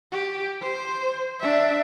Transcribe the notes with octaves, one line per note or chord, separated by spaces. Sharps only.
G4
C5
D4 E5